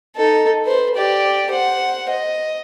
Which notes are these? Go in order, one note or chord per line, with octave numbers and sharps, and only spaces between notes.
D#4 A4
B4 C5
G4 D5
C5 F#5
D#5